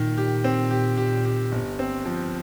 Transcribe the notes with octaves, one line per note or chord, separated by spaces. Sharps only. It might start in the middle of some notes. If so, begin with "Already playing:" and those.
Already playing: A#2 D#3
G4
C4
G4
G4
G4
G1
C4
F3